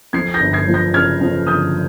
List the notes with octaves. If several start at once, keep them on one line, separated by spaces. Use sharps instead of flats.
F2 G#6 C7
G6 A#6
G1
G#6 C7
F3
G6 A#6
C#3 F6 G#6
F2
G1 D#6 G6